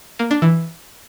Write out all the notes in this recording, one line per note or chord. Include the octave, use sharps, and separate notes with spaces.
A#3
D4
E3